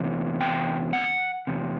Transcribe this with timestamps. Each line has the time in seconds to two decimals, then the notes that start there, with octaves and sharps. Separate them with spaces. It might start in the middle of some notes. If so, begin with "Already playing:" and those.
Already playing: E2 C3
0.41 G5
0.93 F#5
1.47 E2 C3